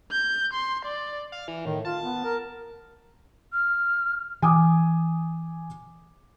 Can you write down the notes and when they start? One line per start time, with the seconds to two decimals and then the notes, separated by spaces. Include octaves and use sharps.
0.11 G6
0.53 C6
0.85 D5
1.32 F5
1.48 E3
1.65 A2 D#3
1.85 F4 A5
2.04 B3
2.24 A#4
3.53 F6
4.42 E3 G#5 D6 D#6